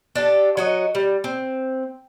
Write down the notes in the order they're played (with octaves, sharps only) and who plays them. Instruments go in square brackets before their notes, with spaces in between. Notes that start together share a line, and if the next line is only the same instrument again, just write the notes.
[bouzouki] D4 G4 A4
F#3 F#4 D#5
G3
C4